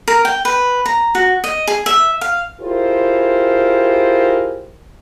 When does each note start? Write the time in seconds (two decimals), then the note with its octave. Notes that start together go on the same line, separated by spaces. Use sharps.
0.08 A#4
0.25 G5
0.45 B4
0.86 A#5
1.15 F#4
1.44 D#5
1.67 G#4
1.86 E5
2.21 F5
2.60 E4 F4 G4 G#4 A#4 C5